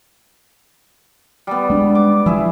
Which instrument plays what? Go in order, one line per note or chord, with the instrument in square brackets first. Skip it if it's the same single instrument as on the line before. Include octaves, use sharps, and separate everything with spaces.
[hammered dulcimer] G3 B3
[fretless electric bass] G#3 D4
[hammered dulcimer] D6
[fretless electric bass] F3 [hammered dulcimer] E4 G#4 E5